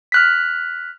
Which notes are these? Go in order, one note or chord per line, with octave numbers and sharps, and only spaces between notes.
F6 F#6 B6